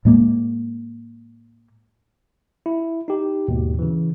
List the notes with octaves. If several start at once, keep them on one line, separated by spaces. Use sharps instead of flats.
A2 G#3 A#3
E4
D#4 G4
D#2 G#2 B2
C#3 E3